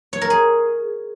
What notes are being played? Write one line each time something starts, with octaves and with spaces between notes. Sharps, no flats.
C#5
A#4
G#4